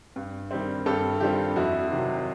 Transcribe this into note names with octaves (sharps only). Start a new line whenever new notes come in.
G2
D#3 G3 C4
G2 G4 A4
D#3 G3 C4 F4 G4
F2 E4 F#4
C3 D#3 F#3